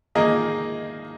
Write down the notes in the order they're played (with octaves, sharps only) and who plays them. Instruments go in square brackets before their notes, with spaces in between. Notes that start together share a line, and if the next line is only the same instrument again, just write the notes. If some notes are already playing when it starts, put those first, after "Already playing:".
[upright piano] D#3 A#3 D#4 G#4 D#5